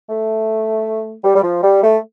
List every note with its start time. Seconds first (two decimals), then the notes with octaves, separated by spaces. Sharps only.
0.09 A3
1.24 G3
1.35 G3
1.43 F3
1.62 G3
1.83 A3